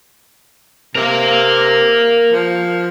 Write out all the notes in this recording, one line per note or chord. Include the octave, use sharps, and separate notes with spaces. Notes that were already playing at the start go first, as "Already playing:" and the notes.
C3 A#4 F5
F3